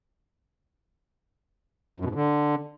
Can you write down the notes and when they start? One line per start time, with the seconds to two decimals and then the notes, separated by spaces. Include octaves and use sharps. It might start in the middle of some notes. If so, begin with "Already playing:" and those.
2.00 F#2
2.05 B2
2.10 G#2
2.15 D3